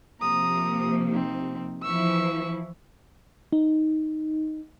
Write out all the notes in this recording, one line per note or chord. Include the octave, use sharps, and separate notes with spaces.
C3 F3 A#3 A#5 D#6
C4 D#4
E3 F3 E4 C#6 E6
D#4